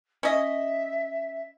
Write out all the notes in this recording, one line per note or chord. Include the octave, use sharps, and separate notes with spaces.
C#4 D#5 E5